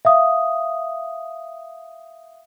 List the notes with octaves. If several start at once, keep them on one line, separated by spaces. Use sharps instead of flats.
E5 F5 D#6